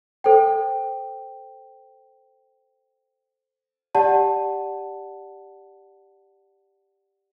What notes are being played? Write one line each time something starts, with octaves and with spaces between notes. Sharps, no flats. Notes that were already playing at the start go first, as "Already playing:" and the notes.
A4 C5 G5
G4 D5 F#5 A5